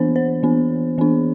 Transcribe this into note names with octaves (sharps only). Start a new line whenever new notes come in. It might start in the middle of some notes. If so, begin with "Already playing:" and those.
Already playing: E3 B3 D4 C5
C5
E3 B3 D4
E3 B3 D4